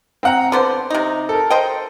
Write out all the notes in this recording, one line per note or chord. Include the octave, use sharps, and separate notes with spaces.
C4 F#5 A#5
D3 B3 C5 D6
C3 D#4
A4 A#4
C5 D#5 G5